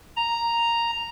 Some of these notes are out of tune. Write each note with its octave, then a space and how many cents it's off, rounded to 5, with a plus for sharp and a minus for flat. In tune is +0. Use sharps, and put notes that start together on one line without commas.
A#5 +0